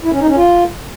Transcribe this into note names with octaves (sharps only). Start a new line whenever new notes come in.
E4
C#4
D#4
C#4
F4